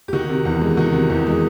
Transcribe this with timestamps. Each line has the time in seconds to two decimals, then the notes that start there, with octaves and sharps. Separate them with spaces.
0.08 G4
0.13 D#3 F#4
0.29 C3
0.45 E2
0.61 G#3
0.77 D#3 F#4
0.93 C3
1.09 E2 G4
1.27 G#3